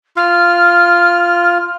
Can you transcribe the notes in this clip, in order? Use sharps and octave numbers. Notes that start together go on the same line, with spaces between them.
F4 F6